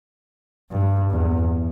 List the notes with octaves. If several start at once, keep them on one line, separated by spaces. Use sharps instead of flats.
G2
E2